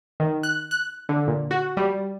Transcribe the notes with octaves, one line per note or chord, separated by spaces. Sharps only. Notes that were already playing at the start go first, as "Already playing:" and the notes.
D#3
F#6
F#6
D3
A#2
F#4
G3